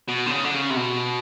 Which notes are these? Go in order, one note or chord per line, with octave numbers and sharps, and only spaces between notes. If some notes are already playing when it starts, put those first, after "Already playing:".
B2
D3
C#3
D3
C#3
C3
B2